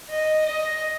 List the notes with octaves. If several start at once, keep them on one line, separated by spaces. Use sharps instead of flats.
D#5
D#5